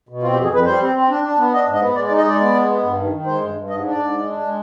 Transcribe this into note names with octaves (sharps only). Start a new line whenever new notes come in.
B2
C4 F4
G4
F2
G#4
F2 B4
G3 C5
C4
C4
D4
D4
B3
D4 D#5
G#2
D#5
B3
G#3 D5
D5
D#4
D#5
G#3 D5
B3
G#3
B3
G2
D#3
D#3
G#3 C5
G2
G2
G#2 D#5
D4
D5
G#2
G#3
D4
G#3